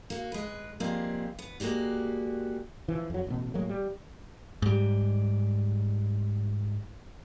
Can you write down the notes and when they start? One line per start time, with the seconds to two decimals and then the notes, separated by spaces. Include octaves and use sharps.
0.10 A#3 F#4
0.32 G#3 B4
0.80 F3 G3 G#3 A#3 C4
1.39 B3
1.60 G#3 A#3 F#4 G4 D5
2.88 E3 F3
3.10 F2 F#3
3.27 A1 B2
3.54 A2 F#3 G#3 A#3
3.69 G3
4.62 G#2 G3